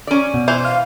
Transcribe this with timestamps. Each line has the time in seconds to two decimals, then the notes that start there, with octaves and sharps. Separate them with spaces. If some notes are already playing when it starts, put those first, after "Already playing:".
0.07 C#4 D5
0.34 B2
0.48 E3 C5
0.65 F5 F6